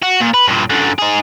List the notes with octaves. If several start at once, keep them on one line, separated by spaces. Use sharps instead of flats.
F#4
A#2
B4
G2 A#2
F#2 D3
D#4 G#4